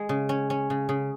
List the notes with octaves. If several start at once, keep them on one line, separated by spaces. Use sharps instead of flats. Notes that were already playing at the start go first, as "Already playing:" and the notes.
Already playing: G#3
C#3
C#4
C#4
C#3
C#3